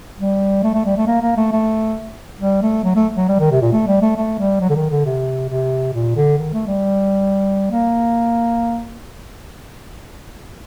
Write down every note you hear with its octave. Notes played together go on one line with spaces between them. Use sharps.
G3
A3
A3
G3
A3
A#3
A#3
A3
A3
G3
A3
F#3
A3
F#3
G3
D#3
C3
A#2
A3
G3
A3
A3
G3
F#3
D3
D#3
D3
C3
C3
A#2
D3
D#3
A3
G3
A#3